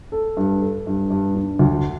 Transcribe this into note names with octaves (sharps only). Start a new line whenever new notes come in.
A4
G2
A4
G2
G2
D4
D2